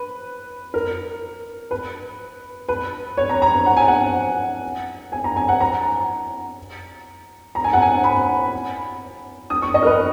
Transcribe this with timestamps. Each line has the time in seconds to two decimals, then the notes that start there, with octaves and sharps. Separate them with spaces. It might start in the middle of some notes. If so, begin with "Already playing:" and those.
Already playing: B4
0.74 A#4
1.71 B4
2.69 B4
3.17 C#5
3.29 A#5
3.42 A#5
3.66 F#5
3.77 G#5
3.88 F#5
5.12 G#5
5.24 A#5
5.36 G#5
5.49 F#5
5.60 A#5
7.55 A#5
7.64 G#5
7.73 F#5
7.82 G#5
8.04 B5
9.50 D#6
9.62 C#6
9.74 D#5
9.83 A#4
9.86 B4